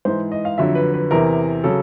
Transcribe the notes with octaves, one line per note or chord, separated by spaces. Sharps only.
G#2 E3 C5
D#5
F5
F2 D3 F#3 E5
B4
B4
E2 C3 E3 A#4
C#3 F#3 A4